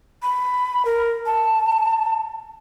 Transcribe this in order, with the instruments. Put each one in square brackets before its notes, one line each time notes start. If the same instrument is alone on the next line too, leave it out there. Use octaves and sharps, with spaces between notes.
[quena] B5
A#4
A5